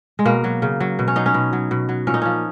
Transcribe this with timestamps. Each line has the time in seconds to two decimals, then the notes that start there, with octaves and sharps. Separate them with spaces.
0.19 G#3
0.25 B2 A#3
0.44 F#3
0.62 C#3
0.80 F#3
0.99 B2
1.08 C#4
1.16 F#3 D#4
1.26 C#4
1.34 B2
1.53 F#3
1.71 B2
1.89 F#3
2.07 A#2 C#4
2.14 D#4
2.22 F3 C#4